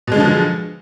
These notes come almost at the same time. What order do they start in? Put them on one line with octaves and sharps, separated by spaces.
B2 G#3 D3 F3 F#3